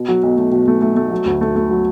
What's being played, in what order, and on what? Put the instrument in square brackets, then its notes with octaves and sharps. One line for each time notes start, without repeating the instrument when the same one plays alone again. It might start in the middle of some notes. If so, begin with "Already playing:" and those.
Already playing: [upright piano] B2
F#3
B1
A3
B2
A3
A3
A3
F#3
D2
A3
A3
F#3